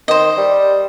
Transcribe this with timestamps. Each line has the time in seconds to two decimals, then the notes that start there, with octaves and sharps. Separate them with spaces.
0.08 D#3 C5 D#5
0.37 G3